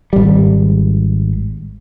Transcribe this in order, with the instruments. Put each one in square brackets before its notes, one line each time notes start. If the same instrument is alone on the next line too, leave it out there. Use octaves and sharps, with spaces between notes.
[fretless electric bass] G#1 G3